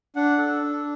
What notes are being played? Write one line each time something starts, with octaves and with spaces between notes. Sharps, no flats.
D4 F#5
A4
D4